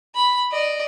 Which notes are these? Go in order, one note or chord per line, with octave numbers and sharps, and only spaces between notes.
B5
D5 D#5